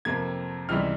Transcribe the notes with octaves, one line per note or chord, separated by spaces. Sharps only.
F2 C3 F3 A#3 G#6
C#2 C3 E3 G3 F6